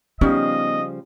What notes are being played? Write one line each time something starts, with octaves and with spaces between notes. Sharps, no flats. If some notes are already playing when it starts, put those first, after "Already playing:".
C#3 F3 G3 B3 C#4 D#4 D#5